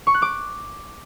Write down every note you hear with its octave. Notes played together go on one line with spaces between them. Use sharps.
C#6
F#6
D6